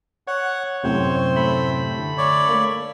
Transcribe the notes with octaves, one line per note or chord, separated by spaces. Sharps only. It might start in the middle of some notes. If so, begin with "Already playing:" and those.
C#5 F#5
F#2 A2 C3 C4 C5
A3 B5
D3
C#5 D5
A#3